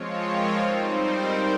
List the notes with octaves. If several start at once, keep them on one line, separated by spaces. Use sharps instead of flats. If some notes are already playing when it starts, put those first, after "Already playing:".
Already playing: F3 G#3 C4 F4 C#5
A#4
G3 C4 D#4 C5
A#4